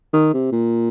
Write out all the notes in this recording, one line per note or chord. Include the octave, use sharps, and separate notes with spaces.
D#3
C3
A#2